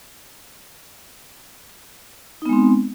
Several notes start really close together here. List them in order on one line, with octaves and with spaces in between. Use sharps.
D#4 B3 G#3 C4